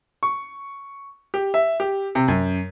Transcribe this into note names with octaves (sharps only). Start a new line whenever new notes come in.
C#6
G4
E5
G4
C3
F#2